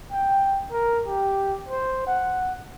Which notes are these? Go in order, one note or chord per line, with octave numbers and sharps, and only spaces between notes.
G5
A#4
G4
C5
F#5